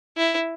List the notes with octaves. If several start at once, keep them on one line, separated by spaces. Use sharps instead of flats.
E4